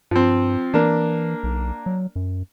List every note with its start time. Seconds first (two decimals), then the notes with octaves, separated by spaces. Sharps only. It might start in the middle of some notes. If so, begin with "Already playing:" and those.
0.11 G2 F3 C4
0.74 E3 A#3 D4
1.43 B1
1.86 F#3
2.16 F#2